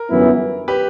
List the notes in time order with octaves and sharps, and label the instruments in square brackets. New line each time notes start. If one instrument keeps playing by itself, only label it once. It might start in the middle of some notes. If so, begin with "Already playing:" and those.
Already playing: [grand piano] A#4
[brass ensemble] G1 F#2 E3 B3 E4
[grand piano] G4 B4